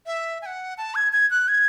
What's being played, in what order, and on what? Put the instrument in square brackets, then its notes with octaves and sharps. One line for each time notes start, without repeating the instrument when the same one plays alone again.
[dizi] E5
G#5
F#5
A5
G#6
G#6
F#6
G#6